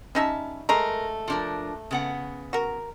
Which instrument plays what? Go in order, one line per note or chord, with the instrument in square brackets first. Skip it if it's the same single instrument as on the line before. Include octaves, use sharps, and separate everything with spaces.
[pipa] G3 D#4 E5 [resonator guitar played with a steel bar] C#4 A5
[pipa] G#3 A3 A#5 [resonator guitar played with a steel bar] A#4
[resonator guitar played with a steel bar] F3 D4 A#4
C#3 B3 F#5
[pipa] F#4 A#4